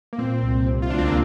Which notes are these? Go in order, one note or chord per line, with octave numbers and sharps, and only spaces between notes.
A#3
A#2 C4
C2
C3
F4
D2 D4
C4
A#3